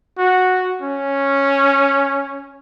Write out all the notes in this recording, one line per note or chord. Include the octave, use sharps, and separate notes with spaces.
F#4
C#4